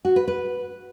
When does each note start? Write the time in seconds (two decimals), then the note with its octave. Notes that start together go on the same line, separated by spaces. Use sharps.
0.05 F#4
0.16 B4
0.27 B4